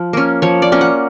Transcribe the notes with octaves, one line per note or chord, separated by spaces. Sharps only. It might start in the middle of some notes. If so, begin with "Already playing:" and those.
Already playing: F3
A#3 C#4
F3 C#5
D5
A#3 C#4
F#5